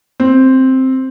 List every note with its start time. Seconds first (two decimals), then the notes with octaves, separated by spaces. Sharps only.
0.20 C4